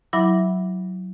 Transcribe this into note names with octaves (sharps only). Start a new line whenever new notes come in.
F#3 E4 E5 B5 D6 A#6